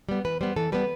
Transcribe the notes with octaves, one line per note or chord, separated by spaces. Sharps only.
G3 B3
E3 B4
G3 B3 C5
E3 A4
G3 B3 B4